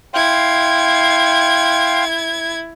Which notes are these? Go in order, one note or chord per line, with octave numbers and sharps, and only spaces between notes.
E4 F5 G5 C6 G#6